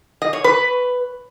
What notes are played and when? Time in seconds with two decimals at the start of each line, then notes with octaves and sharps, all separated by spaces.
0.22 D#5
0.33 C#5
0.44 B4